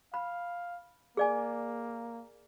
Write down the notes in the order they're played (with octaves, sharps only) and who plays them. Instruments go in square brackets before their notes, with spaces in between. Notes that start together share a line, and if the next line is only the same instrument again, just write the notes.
[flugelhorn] F5 [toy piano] B5
[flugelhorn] A#3 [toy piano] G#4 D5 G#5